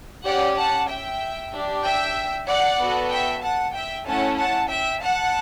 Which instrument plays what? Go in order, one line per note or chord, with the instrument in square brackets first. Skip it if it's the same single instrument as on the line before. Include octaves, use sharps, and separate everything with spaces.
[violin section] C#4 G4 D5 F#5
F#5 A5
E5 G5
D4 G4
E5 G5
D5 F#5
B3 F#4 A4
E5 G5
F#5 A5
E5 G5
A3 C#4 E4 F#5 A5
F#5 A5
E5 G5
F#5 A5